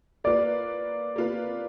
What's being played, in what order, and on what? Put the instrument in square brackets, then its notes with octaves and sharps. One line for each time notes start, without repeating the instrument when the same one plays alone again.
[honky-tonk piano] A#3 F4 B4 [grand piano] D5
[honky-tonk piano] A#3 F4 B4